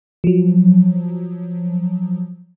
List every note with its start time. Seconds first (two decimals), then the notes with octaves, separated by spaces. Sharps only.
0.24 F3 F#3